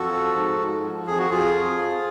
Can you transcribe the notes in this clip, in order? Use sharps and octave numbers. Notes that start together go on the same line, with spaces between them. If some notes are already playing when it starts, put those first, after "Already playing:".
Already playing: F2 F#4 A4
F3
G#2
G#2
F3
F2 G#4
F#4
F2 F4 G#4
F3
F2